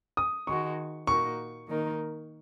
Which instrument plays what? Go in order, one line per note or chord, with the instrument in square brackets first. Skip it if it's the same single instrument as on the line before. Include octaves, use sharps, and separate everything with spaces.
[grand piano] D#6
[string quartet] D#3 G#3 F#4 [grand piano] C#6
[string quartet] A#2 A#3 D#4 F#4 A#4 [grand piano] C#6
[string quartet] D#3 A#3 D#4 A#4